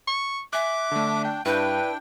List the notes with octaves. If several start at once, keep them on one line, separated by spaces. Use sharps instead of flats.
C#6
E5 G#5 D6 F#6
D3 A3 D4
G5
G2 D4 E4 B4 G5 G6